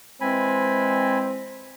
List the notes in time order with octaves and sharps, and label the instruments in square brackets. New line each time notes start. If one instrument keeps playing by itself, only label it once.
[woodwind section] E3 G#3 C4 [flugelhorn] C5 [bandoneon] G#5 B5